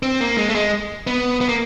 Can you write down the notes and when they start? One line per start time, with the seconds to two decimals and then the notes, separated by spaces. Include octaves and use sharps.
0.03 C4
0.21 A#3
0.38 G#3
0.49 A3
0.55 G#3
1.07 B3
1.41 B3
1.49 A#3